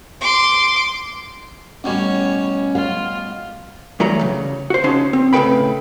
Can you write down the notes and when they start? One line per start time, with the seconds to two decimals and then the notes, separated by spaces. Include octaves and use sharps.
0.21 C6 D6
1.84 A1 B2 G3 C#4 C#5
2.75 F4 F5
4.00 G2 E3 F#3 A3 A#5
4.21 C#3
4.70 F#4 C5
4.84 C#3 C#4 D#4 A5 C6
5.13 C4
5.33 A2 C#3 A4 B4 G5 B5